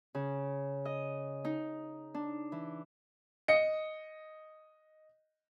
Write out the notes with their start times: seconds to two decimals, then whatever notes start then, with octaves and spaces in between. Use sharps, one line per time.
0.15 C#3
0.85 D#5
1.45 D#4
2.15 D4
2.52 E3
3.48 D#5 C#7